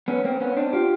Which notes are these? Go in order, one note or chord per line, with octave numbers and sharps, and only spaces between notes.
B3 C#4
A#3 C4
B3 C#4
C4 D4
F4 G4